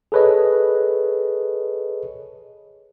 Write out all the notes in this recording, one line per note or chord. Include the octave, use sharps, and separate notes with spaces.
G#4 A4 B4 C#5 D#5